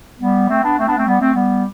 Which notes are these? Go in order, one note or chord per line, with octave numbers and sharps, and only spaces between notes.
G3 B3
A3 C4
B3 D4
A3 C4
B3 D4
A3 C4
G3 B3
A3 C4
G3 B3